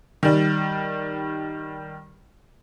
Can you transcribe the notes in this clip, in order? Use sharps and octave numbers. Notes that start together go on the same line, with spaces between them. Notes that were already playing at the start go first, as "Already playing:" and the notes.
D#3 G3